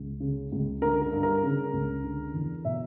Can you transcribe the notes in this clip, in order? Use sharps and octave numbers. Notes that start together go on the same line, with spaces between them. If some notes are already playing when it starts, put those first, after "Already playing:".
Already playing: C#2
C#3
C#2
D3 A#4
A#4
G2
A#4
C#3
C#2
D3
E2
B2 E5